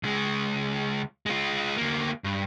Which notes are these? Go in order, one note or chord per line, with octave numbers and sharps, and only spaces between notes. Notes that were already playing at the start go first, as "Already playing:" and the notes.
C#2 G#3
G#3 F4
D2 A#3
G2